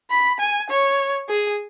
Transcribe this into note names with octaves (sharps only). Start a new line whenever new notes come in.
B5
G#5
C#5
G#4